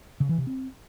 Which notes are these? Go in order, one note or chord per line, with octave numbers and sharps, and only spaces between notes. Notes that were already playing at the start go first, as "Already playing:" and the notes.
C#3
E3
C3
C4